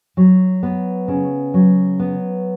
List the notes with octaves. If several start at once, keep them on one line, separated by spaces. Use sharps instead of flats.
F#3
B3
C#3
F#3
B3